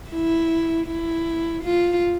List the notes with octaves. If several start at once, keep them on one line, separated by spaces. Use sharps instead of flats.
E4
E4
F4